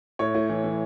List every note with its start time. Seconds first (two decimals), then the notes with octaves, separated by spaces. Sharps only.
0.19 A2 C#5
0.34 A2
0.50 E3
0.64 E3